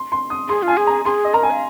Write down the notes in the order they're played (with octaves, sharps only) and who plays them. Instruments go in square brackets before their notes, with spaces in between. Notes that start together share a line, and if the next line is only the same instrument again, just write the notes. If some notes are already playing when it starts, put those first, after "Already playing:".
Already playing: [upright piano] C6
C6
D#6
[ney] G#4 [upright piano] C6
[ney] F4
[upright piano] G#5
[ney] G#4
[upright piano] A#5
[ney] G#4 [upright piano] C6
[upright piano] D#5
[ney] A#4 [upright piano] A#5
[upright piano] G#5
[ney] F5